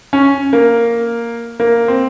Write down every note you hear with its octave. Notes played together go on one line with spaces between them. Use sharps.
C#4
A#3
A#3
C4